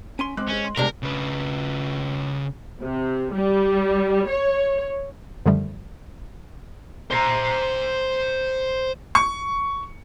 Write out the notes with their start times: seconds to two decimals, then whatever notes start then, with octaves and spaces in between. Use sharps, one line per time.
0.19 C#4 G#5 C6
0.37 G#3 C4 D6 F#6
0.50 C#4 G#4 C5 D#5
0.65 C6
0.77 C3 G3 G#3 B3 D4 A#4
1.03 C#3 B4
2.81 C3
3.32 G3
4.27 C#5
5.46 F#2 D3 D#3 F3 G3 A3
7.11 C5 A#5
9.15 C#6